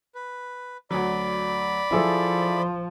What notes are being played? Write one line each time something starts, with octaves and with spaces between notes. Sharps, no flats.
B4
D2 F#3 D5 B5
F3 E4 G#4 A4